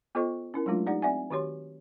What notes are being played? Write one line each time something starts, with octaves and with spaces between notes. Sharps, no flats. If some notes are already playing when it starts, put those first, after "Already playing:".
B3 F4 A4 C5 D#5 C#6
C#4 E4 A#4
F#3 G#3 A3 D4 F4
D#4 G4 D5 F#5
C4 D5 E5 F#5 G#5
D#3 F#4 G4 C#5 C6